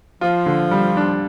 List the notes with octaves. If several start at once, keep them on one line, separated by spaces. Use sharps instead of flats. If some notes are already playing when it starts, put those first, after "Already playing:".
F3 F4
D3
G3
D4